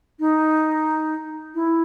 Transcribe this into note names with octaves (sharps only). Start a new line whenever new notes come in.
D#4
E4